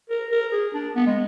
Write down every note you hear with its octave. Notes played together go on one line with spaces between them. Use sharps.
A#4
A#4
G#4
D4
B3
G#3